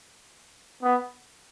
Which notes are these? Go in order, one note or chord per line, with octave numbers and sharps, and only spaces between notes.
B3